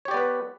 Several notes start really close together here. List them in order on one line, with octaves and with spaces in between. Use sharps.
C#5 G4 D5 B3 B4